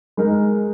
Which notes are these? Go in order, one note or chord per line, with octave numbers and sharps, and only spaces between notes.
G#3 D#4 A#4